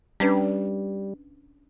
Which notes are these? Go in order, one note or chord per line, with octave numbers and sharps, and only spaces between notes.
G3 C#4 D4 B4